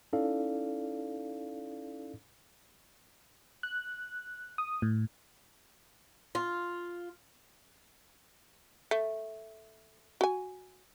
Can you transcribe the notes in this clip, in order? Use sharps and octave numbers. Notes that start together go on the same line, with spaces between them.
C#4 D#4 E4 A4 D5 F5
F#6
D#6
A2
F4
A3
F#4 G#5